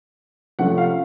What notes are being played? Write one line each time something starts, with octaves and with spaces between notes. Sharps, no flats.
C3 F3 A3 C#4 F#5
F5